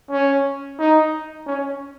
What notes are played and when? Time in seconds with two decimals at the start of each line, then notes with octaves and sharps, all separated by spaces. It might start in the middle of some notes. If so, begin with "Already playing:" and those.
0.11 C#4
0.79 D#4
1.47 C#4